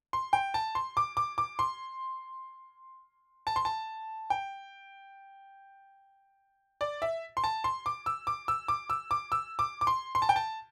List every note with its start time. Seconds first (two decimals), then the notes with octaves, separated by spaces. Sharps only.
0.13 C6
0.33 G5
0.54 A5
0.75 C6
0.97 D6
1.17 D6
1.38 D6
1.59 C6
3.47 A5
3.56 C6
3.65 A5
4.30 G5
6.81 D5
7.02 E5
7.37 C6
7.44 A5
7.64 C6
7.86 D6
8.06 E6
8.27 D6
8.48 E6
8.68 D6
8.90 E6
9.11 D6
9.32 E6
9.59 D6
9.81 D6
9.87 C6
10.15 C6
10.22 A5
10.29 G5
10.36 A5